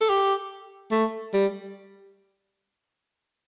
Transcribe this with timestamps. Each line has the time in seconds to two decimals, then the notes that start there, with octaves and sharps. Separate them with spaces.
0.01 A4
0.09 G4
0.92 A3
1.34 G3